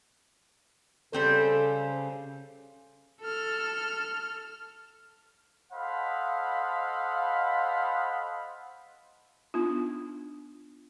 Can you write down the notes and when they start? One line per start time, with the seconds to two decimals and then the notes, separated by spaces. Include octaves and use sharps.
1.13 C#3 G3 C4 A4 C5
3.21 A4 F6
5.73 A4 C5 D#5 F5 F#5 B5
9.54 B3 D4 D#4 F4